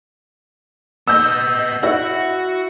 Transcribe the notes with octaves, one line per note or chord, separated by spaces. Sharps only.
B3 D#5 E6 G6
E4 F#4 F#5